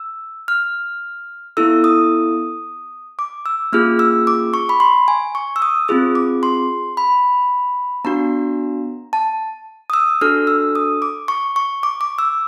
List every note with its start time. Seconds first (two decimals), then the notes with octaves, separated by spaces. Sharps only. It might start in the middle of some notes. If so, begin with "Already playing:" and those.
Already playing: E6
0.48 F6
1.57 B3 E4 A4 E6
1.84 D#6
3.19 D6
3.46 E6
3.73 A#3 C#4 F4 G#4 F6
3.99 E6
4.27 D6
4.54 C#6
4.69 B5
4.80 C6
5.08 G#5
5.35 C#6
5.56 E6
5.62 D#6
5.88 C4 F4 G#4 D#6
6.15 D6
6.43 C6
6.97 B5
8.05 B3 D4 F#4 A#5
9.13 A5
9.90 D#6
9.94 E6
10.21 D4 F#4 A4 F6
10.47 E6
10.75 D#6
11.02 D6
11.28 C#6
11.56 C#6
11.83 D6
12.01 D6
12.19 E6